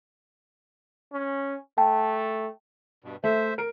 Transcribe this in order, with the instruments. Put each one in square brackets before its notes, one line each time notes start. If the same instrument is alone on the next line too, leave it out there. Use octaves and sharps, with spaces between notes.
[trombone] C#4
[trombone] A3 [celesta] G5 A5
[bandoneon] G2 B2
[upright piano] A3 [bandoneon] C5 E5
[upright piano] A#4 D7